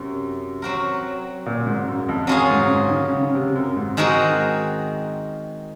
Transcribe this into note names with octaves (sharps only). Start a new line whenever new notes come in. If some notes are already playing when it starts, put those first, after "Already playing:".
Already playing: F#2 C3 F#3 C#4
F#3 C4 F#4 A#4
A#2
G#2
F#2
F2
F#2 F#3 C#4 F4 G#4
G#2
G#2
D#3
C#3
C#3
C3
F#2
G#2
D#3 G#3 C4 F#4 A#4